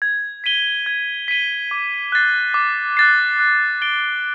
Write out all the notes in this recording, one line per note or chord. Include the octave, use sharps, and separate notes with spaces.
G#6
B6 D#7 G7
G#6
B6 D#7 G7
D6
F#6 A6 C7
D6
F#6 A6 C7
F#6
A6 D7 G7